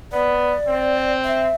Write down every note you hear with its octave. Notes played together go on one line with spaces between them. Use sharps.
B3 D5
C4
E5